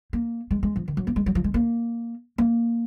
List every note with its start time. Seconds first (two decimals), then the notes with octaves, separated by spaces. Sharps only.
0.13 A#3
0.51 G#3
0.63 G#3
0.76 F3
0.88 D#3
0.97 F#3
1.07 A#3
1.16 G#3
1.26 F#3
1.35 F3
1.44 G#3
1.54 A#3
2.38 A#3